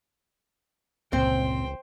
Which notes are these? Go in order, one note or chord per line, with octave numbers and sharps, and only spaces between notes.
G1 C#2 A#2 C#3 C4 C5 G5